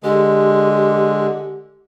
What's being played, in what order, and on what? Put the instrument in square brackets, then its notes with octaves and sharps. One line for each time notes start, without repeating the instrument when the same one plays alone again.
[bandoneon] D3 G#3 [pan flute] G4